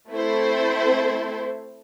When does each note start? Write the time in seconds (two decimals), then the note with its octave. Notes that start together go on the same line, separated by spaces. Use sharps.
0.11 A3 C4 E4 A4 C5